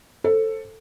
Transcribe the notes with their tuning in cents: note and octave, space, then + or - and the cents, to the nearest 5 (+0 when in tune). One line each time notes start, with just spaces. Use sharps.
A4 +10 C5 +25